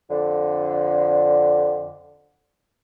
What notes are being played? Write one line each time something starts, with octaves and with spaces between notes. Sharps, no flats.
F2 D3